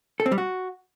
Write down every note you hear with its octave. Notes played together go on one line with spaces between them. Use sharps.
A4
C4
G3
F#4